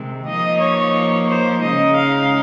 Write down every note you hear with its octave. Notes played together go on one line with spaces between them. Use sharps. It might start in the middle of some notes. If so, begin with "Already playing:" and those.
Already playing: C3 D#3 G#3 C4
F3 A#3 D#4 D#5
C#5
C5
C#3 G#3 D#4 D#5
F5